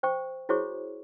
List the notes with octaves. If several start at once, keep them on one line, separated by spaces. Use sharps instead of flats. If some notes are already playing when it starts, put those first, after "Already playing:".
C5 G5 C#6
E4 F#4 G#4 C5 C#5 C#6